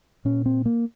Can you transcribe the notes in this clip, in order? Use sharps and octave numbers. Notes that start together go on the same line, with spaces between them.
A#2 C#4
C4
A#3